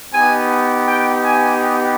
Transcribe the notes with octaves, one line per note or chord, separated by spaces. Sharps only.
B3 D#4 G4 G#5
G5
G#5